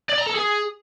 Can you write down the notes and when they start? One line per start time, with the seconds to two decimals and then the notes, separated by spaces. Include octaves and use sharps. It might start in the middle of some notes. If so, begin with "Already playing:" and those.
0.09 D5
0.18 A#5
0.26 A4
0.35 G#4